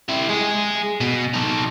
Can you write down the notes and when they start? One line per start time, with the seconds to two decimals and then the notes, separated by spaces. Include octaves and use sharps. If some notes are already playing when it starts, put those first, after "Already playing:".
0.09 E4 G4
0.29 G#3 G#4
1.01 B2
1.33 D#4 A4